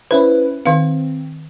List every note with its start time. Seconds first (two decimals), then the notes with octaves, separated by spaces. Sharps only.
0.11 C#4 E4 B4 C5
0.66 D#3 C4 F5